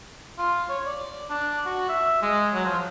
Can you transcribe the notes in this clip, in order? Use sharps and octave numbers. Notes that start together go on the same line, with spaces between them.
F4
C#5
D5
D4
F#4
E5
G#3
F#3
F3